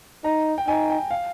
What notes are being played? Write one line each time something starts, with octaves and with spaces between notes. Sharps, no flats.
D#4 A#5
G5
D#4 G#5
G5
F5